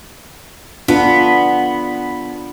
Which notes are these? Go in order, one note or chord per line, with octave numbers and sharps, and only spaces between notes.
B3 D4 F4